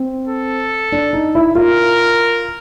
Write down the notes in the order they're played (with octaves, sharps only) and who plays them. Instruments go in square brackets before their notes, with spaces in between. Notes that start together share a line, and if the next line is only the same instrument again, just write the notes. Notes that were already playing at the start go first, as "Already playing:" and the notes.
Already playing: [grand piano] C4
[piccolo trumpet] A4
[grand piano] D4
D#4
E4
[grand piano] F4 [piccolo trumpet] A#4